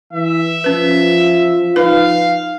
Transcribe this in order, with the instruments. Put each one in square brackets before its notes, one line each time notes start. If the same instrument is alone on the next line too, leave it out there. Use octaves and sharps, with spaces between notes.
[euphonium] E3 [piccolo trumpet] E5
[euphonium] F3 [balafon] C#4 B4
[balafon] D#4 B4 [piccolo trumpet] F5